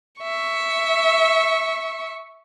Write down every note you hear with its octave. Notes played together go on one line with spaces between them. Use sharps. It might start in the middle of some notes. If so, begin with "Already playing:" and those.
E5 C#6